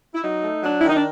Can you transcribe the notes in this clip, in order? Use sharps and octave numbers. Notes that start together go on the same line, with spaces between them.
E4
F#3 D#4
A3
F#3 D4
E4
D#3
D#4
D4